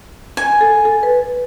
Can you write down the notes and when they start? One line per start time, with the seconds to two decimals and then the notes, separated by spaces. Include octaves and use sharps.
0.37 G#5
0.61 A4
0.85 A4
1.03 B4